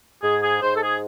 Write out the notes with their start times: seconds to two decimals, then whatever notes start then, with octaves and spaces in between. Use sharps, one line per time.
0.22 G#2 G#4
0.42 G#4
0.62 G#2 C5
0.76 A4
0.82 G#4